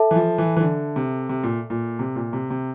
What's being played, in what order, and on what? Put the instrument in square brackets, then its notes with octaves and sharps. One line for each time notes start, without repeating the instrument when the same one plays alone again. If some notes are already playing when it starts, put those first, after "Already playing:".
Already playing: [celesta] A4 E5 A5
[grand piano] E3
F3
E3
E3
D3
C3
C3
A#2
A#2
C3
A#2
C3
C3